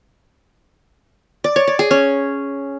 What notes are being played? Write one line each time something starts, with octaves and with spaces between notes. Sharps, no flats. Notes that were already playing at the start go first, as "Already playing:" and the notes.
D5
C#5
D5
G#4
C#4